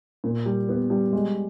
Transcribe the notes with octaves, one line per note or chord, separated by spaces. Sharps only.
A#2
G3
B3
G3
G#3